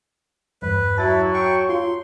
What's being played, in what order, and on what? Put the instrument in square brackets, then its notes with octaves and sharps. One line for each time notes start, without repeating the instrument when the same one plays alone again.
[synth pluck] E2 G2 [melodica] B4
[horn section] F#3 [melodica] E4 [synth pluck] A5 A6
[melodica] G5 C#6
[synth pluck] F4 [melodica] C6